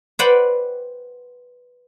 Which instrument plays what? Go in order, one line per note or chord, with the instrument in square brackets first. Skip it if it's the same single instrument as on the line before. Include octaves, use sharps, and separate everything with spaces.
[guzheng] B4 C5 D5 F#5 G5 B5